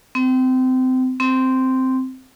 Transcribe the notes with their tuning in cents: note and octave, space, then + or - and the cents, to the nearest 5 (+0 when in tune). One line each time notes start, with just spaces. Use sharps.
C4 -25
C4 -5